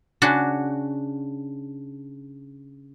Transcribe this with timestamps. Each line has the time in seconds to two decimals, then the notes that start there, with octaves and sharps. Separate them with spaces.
0.22 C#3 D4 F#4